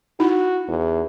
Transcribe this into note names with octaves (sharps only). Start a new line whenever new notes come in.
D#4 E4 F#4
E2